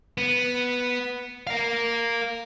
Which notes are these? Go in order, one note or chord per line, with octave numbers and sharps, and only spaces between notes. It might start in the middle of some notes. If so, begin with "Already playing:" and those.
B3
A#4 F5